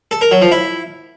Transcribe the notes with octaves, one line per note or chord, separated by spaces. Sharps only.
A4
A#4
F#3
F3
E4